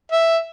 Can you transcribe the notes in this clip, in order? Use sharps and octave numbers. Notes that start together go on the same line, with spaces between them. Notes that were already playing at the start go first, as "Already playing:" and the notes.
E5